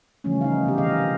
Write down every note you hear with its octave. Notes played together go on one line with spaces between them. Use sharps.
C#3 E3 F3 G3 A3 C#4
D#4 F5
C3 B3 G4
D#3 E3 G#4 D#5 F5
F3